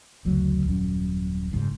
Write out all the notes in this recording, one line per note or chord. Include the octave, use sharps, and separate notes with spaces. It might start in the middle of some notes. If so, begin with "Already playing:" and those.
F#1 D2 F#3
D#1 F#2
F#1 G#2